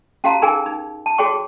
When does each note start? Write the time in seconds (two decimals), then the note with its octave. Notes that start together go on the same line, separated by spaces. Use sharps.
0.24 C#4 F#4 G4 F5 A5 A#5
0.42 D#4 G#4 A#4 G5 G#5
0.66 D#4
1.06 A5
1.18 F#4 G#4 C#5 G5 C#6